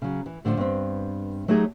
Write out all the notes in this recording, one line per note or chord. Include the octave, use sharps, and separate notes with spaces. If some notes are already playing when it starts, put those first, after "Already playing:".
C#3 F#3
E3
A2 D3 E3 F3
G2 B3 C4
F#3 A3 D#4 G4 G#4